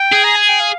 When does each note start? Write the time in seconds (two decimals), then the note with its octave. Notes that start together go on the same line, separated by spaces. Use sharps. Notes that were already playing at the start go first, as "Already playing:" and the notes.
Already playing: G5
0.12 G#4
0.24 A#5
0.36 G#5
0.49 G5
0.60 F5